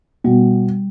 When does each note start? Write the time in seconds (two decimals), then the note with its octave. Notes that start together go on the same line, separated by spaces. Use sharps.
0.24 B2 G3